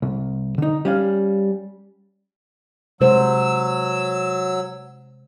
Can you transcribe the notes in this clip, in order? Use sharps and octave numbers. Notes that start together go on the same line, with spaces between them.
C2
D3 D#4
G3 C#4 F5
C3 F#3 G#3 C5 E6